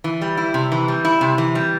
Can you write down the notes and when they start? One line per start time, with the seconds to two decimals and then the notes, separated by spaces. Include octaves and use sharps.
0.04 E3
0.21 G3
0.37 E4
0.54 C3
0.72 E3
0.88 G3
1.05 E4
1.21 C3
1.38 E3
1.55 G3